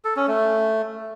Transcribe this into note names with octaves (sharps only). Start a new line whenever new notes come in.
A4
C#4
A3